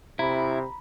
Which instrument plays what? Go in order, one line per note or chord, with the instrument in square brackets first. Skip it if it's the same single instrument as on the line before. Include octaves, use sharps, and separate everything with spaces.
[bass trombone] C3 [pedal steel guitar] E4 [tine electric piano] A#5 B5